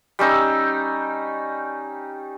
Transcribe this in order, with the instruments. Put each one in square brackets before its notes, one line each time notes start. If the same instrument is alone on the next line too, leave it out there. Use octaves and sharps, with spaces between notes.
[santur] G3 C#4 D#4 E6